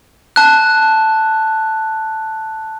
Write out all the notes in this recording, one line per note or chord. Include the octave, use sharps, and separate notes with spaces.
A5 F#6